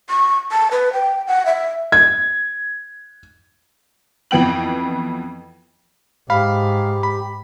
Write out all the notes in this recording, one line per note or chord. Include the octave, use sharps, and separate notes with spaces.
C#6
A5
B4
G5
F#5
E5
G#6
F2 E3 B3 G5 F#7
G#2 G4 F5 B5
B5